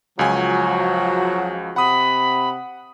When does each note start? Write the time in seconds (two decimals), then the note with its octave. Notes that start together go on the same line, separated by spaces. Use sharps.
0.19 C#2 F3 F#3 F#4 G#5
1.76 C3 F#5 B5 D#6